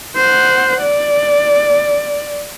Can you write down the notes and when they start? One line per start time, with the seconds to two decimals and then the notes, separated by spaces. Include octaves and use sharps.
0.16 C5 F#5
0.81 D5